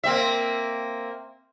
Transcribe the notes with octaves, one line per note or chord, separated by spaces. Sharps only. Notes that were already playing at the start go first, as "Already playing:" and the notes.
A#3 C4 E5